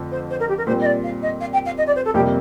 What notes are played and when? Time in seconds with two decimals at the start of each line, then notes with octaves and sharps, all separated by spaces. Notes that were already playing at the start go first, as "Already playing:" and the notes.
Already playing: F2 D3 A3
0.11 C5
0.30 C5
0.40 A#4
0.48 G4
0.58 A#4
0.67 A#2 G3 C4 C5
0.81 D#5
0.85 D5
1.04 F5
1.22 D#5
1.40 F5
1.53 G5
1.66 F5
1.77 D#5
1.87 D5
1.95 C5
2.05 A4
2.14 F2 C3 G3 A#3 G4